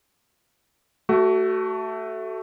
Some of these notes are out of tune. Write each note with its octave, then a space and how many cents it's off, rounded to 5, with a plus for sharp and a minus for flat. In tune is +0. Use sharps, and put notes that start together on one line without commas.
A3 +0 F#4 +25